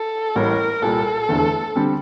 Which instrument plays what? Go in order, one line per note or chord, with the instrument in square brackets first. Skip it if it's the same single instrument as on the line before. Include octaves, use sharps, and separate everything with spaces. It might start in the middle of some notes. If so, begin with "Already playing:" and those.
Already playing: [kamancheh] A4
[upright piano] A1 A2 G3 [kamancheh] A#4
[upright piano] C2 A#2 G3 [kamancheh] A4
[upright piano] F1 E2 D3 A3
D3 G3 C4